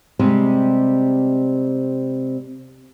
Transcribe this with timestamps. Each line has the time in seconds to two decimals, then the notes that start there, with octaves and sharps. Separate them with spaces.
0.19 C3 G3 G#3 C4